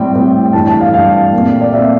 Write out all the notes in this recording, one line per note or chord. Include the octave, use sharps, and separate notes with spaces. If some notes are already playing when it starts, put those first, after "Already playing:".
Already playing: A2 G3 C4 G5
A2 G3 C4
G2 E3 A3 A5
A5
F5
G2 E3 A3 F5
A#2 A3 C4
D5
A#2 A3 C4 E5